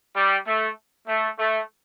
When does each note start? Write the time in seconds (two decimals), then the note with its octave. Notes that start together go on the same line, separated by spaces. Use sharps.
0.16 G3
0.47 A3
1.07 A3
1.38 A3